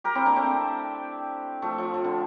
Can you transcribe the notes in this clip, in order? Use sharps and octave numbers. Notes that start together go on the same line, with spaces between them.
G4 A#4
C4 E4
A#3 D4
A3 C4
F3 A3
F3
F3
D3